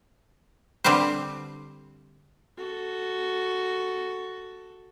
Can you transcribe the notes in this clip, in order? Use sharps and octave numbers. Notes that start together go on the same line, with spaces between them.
D3 G3 C4 G4 B4 C5
F#4 A4